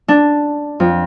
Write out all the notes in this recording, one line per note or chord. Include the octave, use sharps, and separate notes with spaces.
D4
F2